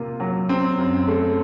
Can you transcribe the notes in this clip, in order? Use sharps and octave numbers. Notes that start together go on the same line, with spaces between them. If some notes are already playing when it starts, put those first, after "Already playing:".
Already playing: C3 A#3 F4
F#3
C4
F#2
A3